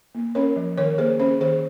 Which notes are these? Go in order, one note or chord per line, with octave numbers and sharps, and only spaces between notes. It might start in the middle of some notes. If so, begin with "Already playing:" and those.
A#3
C#4 A#4 C#5
F3
D#3 A#4 C#5
A#3 G#4 C5
C#4 G#4 C5
D#3 G#4 C5